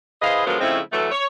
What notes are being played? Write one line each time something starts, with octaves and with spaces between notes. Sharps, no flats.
E4 G#4 B4 C5 D#5 F5
D3 F3 F#3 G#3 B3 A#4
C#3 F3 G#3 A3 C4 E4
D2 E3 F#3 A3
C#5